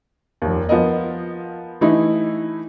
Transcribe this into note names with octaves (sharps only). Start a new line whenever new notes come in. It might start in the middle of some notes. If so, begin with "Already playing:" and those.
F1 D#2
F3 B3 A#4 D#5
E3 A3 D#4 E4